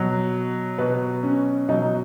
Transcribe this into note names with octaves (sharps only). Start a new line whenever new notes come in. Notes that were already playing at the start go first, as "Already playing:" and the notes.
Already playing: B2 F#3
B2 F#3 B4
C#4
B2 F#3 D#4